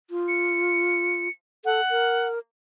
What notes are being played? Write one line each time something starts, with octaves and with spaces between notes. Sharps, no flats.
F4
C#7
A4 F#5
A#4